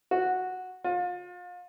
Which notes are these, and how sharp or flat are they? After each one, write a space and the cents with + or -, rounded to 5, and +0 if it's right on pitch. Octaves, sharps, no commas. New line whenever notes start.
F#4 -5
F4 +35